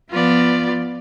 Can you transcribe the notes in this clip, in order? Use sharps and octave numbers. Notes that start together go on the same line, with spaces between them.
F3 B3 F4 D5